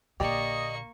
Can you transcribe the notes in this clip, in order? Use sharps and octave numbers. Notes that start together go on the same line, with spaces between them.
A#1 D3 A#3 G4 D5 D#5 C#6